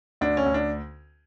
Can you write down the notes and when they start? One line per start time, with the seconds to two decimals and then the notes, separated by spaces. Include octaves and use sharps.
0.21 D2 D4
0.37 C#4
0.46 D2
0.54 D4